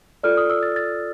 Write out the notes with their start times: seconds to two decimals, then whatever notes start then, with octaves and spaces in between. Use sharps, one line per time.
0.23 F4 A4 D5 F6
0.37 D#6
0.50 E6
0.63 A6
0.76 A6